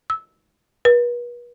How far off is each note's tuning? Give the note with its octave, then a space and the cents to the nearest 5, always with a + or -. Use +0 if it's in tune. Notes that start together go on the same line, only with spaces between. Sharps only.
E6 -15
B4 -40